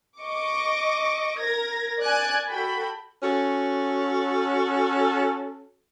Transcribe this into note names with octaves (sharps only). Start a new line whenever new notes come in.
D#5 C#6 D6
A#4 G#6 A#6
D5 G#5 F#6 G#6
F#4 A4 G5 B5
C#4 F#4 A4